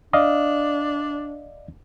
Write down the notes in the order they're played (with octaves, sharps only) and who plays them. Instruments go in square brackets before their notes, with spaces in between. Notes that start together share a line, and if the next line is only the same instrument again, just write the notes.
[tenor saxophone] D4 [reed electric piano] D5 D#5 F5